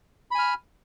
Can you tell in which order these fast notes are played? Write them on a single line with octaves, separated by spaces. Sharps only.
B5 G#5 F6